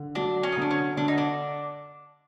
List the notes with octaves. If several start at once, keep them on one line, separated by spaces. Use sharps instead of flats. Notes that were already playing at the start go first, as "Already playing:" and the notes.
Already playing: D3
F#3 D4
C#4
D#4
D3 D4
C#4
D3 D4
D#4
D4